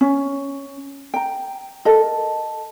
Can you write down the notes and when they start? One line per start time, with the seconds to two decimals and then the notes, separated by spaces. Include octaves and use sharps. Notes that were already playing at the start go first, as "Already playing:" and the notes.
0.01 C#4
1.14 G5 A#5
1.85 A4 A#4 D#5